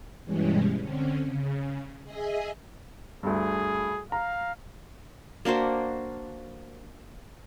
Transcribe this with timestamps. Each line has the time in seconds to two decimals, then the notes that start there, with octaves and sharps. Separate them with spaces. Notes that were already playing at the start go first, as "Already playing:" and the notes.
0.24 G2 B2 E3 G3 G#3 C#4
0.81 D3 C4 C#4
1.25 C#3
2.04 G#4 D#5 E5 G#5
3.23 D2 G2 G#4
4.12 F5 A#5
5.45 A#3 D4 F#4 C5